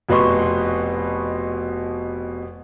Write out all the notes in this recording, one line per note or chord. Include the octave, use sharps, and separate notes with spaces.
F1 B2 B4 D#5 C6 C#6